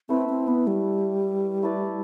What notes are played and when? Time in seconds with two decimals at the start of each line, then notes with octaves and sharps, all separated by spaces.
0.09 A3 C4 E4 B4 E5
0.29 C4
0.48 B3
0.67 G3
1.63 A3 E4 B4 D5